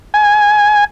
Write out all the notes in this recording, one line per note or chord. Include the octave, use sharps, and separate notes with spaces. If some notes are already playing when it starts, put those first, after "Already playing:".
G#5